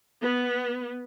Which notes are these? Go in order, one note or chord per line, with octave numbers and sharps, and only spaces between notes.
B3